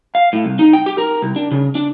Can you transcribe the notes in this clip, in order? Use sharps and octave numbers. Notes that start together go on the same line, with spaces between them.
F5
A2
C2
D#4
G5
G4
A#4
C2
D4
C#3
D4